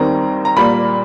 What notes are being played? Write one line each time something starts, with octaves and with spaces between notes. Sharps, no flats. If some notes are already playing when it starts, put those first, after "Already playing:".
Already playing: D#2 D#3 G3 C4 A#5
A#5
A#2 G3 A#3 B5